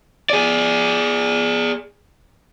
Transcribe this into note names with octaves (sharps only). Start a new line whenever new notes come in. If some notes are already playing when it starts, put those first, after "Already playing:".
G#4 D5